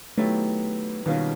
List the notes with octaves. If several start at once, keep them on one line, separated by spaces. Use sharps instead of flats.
D#3 F#3 A3 B3 E4 G4
B2 D#3 G3 A#3 C#4 F4